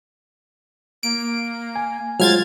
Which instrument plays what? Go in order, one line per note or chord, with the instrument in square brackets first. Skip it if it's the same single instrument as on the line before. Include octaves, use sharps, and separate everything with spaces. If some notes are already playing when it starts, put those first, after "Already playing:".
[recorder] A#3 [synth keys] D7
[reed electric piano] G#5
[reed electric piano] F#3 G#3 F4 [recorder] C5 [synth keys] F6 G#6 A6